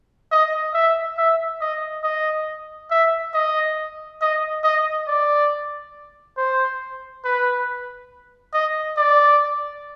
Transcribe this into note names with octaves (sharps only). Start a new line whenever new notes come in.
D#5
E5
E5
D#5
D#5
E5
D#5
D#5
D#5
D5
C5
B4
D#5
D5